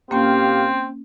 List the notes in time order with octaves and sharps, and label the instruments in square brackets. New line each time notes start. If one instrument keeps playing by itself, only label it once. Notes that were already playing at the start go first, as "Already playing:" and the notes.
[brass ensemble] A#2 G4 F5 [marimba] A#3 C#4 [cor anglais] C4